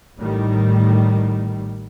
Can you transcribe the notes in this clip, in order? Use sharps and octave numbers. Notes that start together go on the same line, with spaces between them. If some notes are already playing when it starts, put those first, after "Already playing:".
A1 A2 D#3 G3